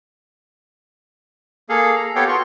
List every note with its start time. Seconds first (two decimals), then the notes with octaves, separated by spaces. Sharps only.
1.69 A#3 G#4 A4 F5
1.95 A#5
2.15 B3 G4 A4 C#5 F5 G5
2.28 F4 F#4 C6 C#6